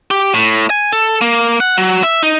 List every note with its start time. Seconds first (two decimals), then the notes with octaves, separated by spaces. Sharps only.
0.11 G4
0.34 A2
0.70 G#5
0.92 A4
1.21 A#3
1.60 F#5
1.78 F#3
2.03 E5
2.23 D#4